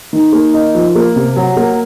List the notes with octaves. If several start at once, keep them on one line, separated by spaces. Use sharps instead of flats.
D#3
A#3
D#4
F3
A#3
C3
F#3
A#3